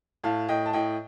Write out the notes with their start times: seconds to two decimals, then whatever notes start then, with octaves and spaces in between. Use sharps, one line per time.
0.24 A2 F5 A5
0.49 A2 D#5 G5
0.66 A5
0.73 A2 D#5 G5